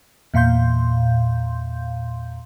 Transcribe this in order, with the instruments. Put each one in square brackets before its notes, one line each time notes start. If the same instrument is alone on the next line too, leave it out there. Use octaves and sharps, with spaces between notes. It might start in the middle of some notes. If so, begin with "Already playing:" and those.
[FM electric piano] E2 A#2 F5 C6 G6